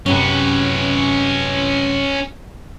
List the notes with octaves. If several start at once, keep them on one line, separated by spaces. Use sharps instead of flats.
F#2 C3 C#4 B4